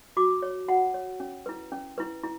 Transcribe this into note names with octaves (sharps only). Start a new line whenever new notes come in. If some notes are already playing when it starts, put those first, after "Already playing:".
F#4 D6
C#5
F#4 F#5
C#5
C#4
E4 B4
C#4
E4 B4
E4